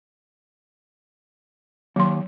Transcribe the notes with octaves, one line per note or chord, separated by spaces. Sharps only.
D#2 F#3 C6